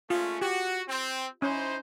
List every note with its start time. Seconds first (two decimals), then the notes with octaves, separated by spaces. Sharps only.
0.10 G#3 A3 C#4 F4
0.41 F#4 G4
0.89 C4
1.42 C#4 D#4 E4 C5